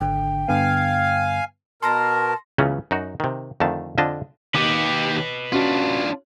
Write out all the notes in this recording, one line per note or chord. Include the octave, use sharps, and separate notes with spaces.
G#1 D3 G5
G2 D3 B3 F5 G#5
B2 A#4 A5 C6 A#6
C#2 C#3 E3 F#3 B3 C#4
F#2 D#4 F#4
C3 D#3
F2 D3 D#3 A3 A5
F2 D3 F3 D4 D#5 A5
D#2 G4 B4 D#5 D6
C#4 D4 F4 F#4